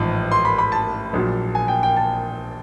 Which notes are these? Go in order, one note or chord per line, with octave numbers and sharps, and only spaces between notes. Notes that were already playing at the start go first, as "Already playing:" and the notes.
Already playing: A1 G#2 F3
C6
B5
B5
A5
A#1 A#2 F#3
G#5
G5
G5
A5